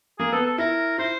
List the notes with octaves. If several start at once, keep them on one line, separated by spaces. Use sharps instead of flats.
A#3 G#4
B3 A4
A4
E4 A#4
E4 C5